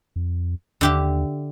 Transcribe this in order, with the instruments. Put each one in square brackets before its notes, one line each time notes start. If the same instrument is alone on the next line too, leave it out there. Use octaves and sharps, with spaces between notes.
[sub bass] F2
[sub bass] D#2 [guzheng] D3 G4 E5